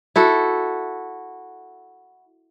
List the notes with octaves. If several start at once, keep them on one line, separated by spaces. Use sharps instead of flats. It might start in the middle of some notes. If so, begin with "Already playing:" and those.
E4 F#4 A4